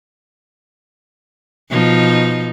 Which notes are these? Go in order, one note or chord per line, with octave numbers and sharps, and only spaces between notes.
B2 F3 D#4